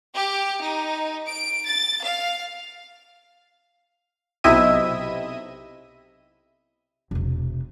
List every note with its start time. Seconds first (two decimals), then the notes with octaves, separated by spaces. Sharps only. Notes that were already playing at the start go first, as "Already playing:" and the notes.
0.13 G4
0.60 D#4
1.27 D7
1.68 A6
2.03 F5
4.44 B1 C3 E4 D#5 E5 D#7
7.11 E1 C3